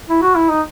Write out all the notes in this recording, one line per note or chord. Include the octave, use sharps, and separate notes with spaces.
E4
F#4
E4
D#4